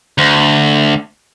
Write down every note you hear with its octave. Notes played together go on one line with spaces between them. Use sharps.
D2